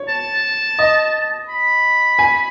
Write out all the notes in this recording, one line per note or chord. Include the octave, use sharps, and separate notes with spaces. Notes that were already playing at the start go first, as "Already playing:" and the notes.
Already playing: C#5
A5
D#5
B5
G#5